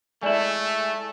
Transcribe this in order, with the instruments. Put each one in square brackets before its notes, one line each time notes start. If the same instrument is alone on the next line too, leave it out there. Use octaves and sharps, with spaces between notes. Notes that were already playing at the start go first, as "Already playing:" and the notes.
[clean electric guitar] G#3 E4 [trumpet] A3 [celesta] D5 G#5